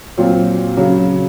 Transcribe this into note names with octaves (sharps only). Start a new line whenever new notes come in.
A#2 F#3 C4 F4
C#3 F#3